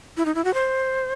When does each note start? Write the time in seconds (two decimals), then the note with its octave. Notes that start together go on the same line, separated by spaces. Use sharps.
0.17 E4
0.25 D#4
0.35 E4
0.45 F#4
0.54 C5